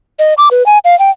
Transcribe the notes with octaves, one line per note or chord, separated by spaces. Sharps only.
D#5
D6
B4
G#5
F5
G5